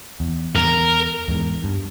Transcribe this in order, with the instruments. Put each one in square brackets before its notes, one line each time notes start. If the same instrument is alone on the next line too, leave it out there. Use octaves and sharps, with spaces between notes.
[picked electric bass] E2
[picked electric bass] E2 [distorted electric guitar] A#4
[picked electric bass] E2 G#2
G2